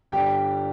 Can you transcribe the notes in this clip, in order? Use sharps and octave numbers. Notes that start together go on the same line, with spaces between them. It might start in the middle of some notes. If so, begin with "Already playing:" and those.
G1 G2 D3 G3 D4 G4 G5